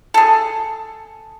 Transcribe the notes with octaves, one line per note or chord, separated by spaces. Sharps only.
G#4 A4